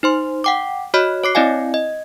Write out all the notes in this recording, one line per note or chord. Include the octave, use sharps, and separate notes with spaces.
D#4 C5 C6
F#5 G5 D6
F#4 C#5 D#5 B5 F6
C#5 D6 C7
C4 E4 D5 D#5 F5 G#5
D#5